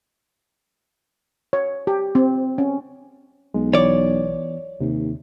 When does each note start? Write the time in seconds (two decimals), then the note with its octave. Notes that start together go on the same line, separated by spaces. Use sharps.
1.53 C#5
1.87 G4
2.15 C4
2.58 C#4
3.54 B1 G#3
3.74 E3 B3 C#5 D5
4.80 D#2 C3